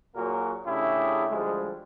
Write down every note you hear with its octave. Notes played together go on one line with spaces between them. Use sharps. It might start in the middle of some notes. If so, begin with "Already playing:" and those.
A#2 F#3 A#3 F#4 G#4 A#4
C#3 A3 D4 E4 G4 G#4
D2 F3 G3 G#3